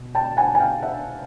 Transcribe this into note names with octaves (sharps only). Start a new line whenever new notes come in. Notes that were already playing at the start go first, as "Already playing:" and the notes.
Already playing: B2
G5 A5
F#5 G#5
G#5
F5 G5
E5 F#5